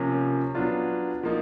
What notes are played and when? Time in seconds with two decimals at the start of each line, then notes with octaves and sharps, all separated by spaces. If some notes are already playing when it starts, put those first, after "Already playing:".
Already playing: C3 F3 A#3 C#4
0.55 F#3 B3 D4 F4
1.23 F3 A#3 D#4